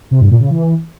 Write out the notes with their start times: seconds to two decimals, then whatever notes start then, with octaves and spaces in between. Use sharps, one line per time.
0.11 C3
0.21 G2
0.30 A#2
0.40 C#3
0.50 E3